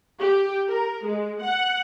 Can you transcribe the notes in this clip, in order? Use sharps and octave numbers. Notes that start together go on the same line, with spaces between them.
G4
A#4
G#3
F#5